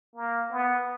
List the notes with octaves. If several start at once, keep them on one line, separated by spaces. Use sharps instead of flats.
A#3
B3